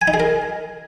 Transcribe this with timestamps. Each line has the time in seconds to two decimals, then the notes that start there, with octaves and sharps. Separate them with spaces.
0.02 G#5
0.08 D#4
0.14 G#4
0.20 A#4